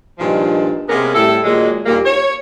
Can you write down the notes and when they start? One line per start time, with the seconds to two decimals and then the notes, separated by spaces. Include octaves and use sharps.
0.19 G2 A#2 D#3 F3 G#3 D4
0.89 C3 G#3 A#3 B3 C#4 A#4
1.15 A2 G3 E4 A4
1.44 A#2 D#3 F#3 G#3
1.86 D#2 A#2 G3 A#3
2.05 C#5